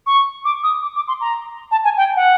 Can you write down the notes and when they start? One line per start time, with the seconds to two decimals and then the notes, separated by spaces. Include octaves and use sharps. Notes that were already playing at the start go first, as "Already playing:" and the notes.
0.06 C#6
0.45 D6
0.63 D#6
0.82 D6
0.95 D6
1.08 C6
1.21 A#5
1.71 A5
1.84 G#5
1.97 G5
2.16 F#5